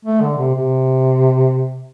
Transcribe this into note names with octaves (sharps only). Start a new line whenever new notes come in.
A3
D3
C3
C3